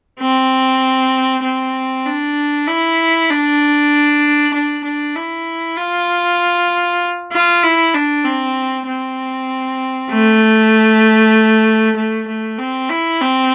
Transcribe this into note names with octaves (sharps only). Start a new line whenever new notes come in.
C4
C4
D4
E4
D4
D4
D4
E4
F4
F4
E4
D4
C4
C4
A3
A3
A3
C4
E4
C4